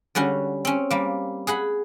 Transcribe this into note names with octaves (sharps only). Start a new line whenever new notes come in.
D3 G3 C#4 F#4
C4 C#4
G3 A#3
G#4 F#5 B5